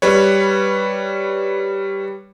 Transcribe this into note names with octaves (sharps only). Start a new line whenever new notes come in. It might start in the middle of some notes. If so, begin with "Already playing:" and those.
G3 B4 C#5